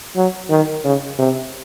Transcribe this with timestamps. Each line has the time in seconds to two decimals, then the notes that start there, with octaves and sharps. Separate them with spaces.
0.16 F#3
0.50 D#3
0.84 C#3
1.19 C3